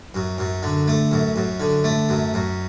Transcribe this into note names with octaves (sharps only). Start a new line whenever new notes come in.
F#2
F#2
D3
A3
F#2
F#2
D3
A3
F#2
F#2